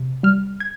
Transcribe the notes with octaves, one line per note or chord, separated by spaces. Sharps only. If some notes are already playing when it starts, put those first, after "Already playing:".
Already playing: C3
G3 F6
G#6